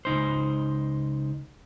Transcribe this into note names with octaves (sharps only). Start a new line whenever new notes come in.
C#2 D#4 C5